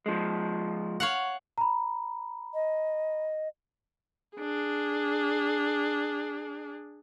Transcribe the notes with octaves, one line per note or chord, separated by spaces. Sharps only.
F3 G#3
C#5 F5 F#5
A#5 B5
D#5
D4 G#4